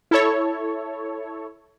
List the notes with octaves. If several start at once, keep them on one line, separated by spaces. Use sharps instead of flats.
E4 A4 C#5